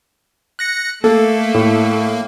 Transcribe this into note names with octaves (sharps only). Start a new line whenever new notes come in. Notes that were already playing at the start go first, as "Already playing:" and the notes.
F#6 A#6 C#7
A3 A#3 A4
A2